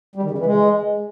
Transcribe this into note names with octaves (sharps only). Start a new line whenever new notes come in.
G3
D#3
C#3
E3
G#3